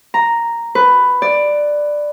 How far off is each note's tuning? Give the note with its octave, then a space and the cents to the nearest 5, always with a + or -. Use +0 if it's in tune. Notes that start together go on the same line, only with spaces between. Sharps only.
A#5 +0
B4 +10
D5 +10